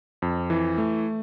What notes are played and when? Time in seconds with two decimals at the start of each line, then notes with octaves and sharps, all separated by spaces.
0.22 F2
0.50 E3
0.78 A3